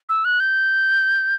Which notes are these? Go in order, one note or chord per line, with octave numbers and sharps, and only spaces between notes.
E6
F#6
G6